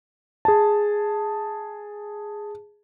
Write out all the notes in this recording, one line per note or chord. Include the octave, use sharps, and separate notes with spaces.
G#4 A5